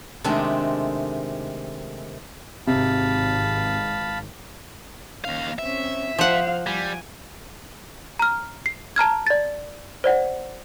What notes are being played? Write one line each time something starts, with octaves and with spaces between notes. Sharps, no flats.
C3 D#3 G#3 A3 D4
G#1 C3 F5 A5 B5
D#2 C#4 F5
C4 C#4 E5
F3 C5 F5 F#5
G3 G#5
A#5 F6
C7
A5 A#5 F6 G#6
D5 A6
C5 D5 F#5